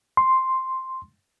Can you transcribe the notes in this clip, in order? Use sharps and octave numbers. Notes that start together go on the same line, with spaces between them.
C6